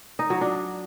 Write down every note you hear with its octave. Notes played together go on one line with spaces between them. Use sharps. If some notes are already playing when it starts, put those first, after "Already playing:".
D#4
F#3
D4